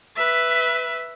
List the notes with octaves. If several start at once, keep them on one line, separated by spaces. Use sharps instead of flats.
B4 E5